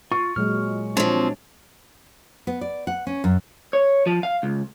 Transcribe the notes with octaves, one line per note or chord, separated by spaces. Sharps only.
F4 C#6
A#2 F#3 G#3 F6
F3 C4 D4 C#5
B3
D5
F#5
C#4
F#2
C#5
F3
F5
C#2